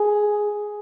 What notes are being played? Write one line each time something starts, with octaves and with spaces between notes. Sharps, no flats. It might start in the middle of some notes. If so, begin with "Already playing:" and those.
Already playing: G#4